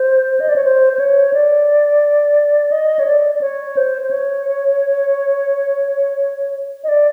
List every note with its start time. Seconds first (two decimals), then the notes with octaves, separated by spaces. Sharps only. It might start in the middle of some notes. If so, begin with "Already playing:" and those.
Already playing: C5
0.40 D#5
0.49 D5
0.56 C#5
0.64 C5
0.93 C5
0.99 C#5
1.33 D5
2.72 D#5
2.99 C#5
3.07 D5
3.35 D5
3.41 C#5
3.77 C5
4.02 C5
4.11 C#5
6.84 D#5
6.89 D5